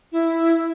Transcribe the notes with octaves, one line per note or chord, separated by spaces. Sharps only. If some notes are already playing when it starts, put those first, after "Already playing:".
E4